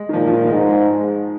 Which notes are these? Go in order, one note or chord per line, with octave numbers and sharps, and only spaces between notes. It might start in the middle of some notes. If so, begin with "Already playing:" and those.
Already playing: G#3
D#3
A#2 F3
F3
D#3
G#3
G#2 F3